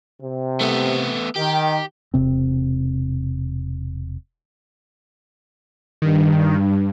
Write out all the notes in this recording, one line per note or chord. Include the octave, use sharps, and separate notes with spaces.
C3
A3 B3
D#3 G4
E1 C3 C4
G2 D#3